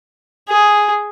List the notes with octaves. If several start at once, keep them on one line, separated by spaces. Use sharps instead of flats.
G#4